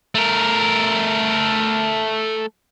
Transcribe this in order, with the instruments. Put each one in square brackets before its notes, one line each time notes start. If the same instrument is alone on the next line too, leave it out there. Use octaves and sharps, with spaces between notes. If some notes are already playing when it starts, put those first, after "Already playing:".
[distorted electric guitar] A3 A#4